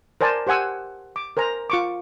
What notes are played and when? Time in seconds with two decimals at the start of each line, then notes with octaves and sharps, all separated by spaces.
0.21 A#4 C5 D5 G#5 A5
0.47 G4 C5 F#5 G#5 E6
1.16 D6
1.37 A#4 C5 G#5 A#5
1.70 F4 C#6 D6